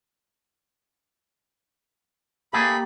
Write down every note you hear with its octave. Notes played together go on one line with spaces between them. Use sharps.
A3 A#3 G4 G#4 B5